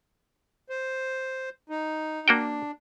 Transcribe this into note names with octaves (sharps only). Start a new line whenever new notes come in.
C5
D#4
A#3 D4 F#4 G5